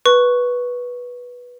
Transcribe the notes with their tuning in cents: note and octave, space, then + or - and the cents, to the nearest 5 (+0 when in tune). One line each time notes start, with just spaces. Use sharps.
B4 -10 C#6 +0